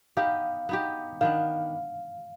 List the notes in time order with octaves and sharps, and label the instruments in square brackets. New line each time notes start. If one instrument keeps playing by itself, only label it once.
[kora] B3 D#4 G4 [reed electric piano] F5
[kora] B3 D#4 G4
[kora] D#3 B3 D4 [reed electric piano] F5